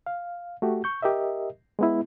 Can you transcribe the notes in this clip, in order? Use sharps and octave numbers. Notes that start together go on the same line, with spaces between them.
F5
A3 F#4 G4
C#6 G6
G4 A#4 D#5 E5
G#3 B3 E4